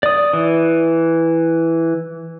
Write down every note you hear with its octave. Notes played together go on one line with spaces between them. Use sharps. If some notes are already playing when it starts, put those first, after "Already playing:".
D5 D#6
E3